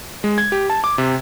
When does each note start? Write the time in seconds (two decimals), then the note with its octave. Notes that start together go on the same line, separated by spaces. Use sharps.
0.24 G#3
0.38 G#6
0.52 G4
0.70 A5
0.84 D6
0.98 C3